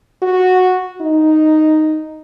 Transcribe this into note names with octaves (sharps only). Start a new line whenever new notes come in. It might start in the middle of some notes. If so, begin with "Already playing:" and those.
F#4
D#4